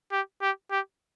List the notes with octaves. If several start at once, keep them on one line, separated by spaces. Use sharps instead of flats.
G4
G4
G4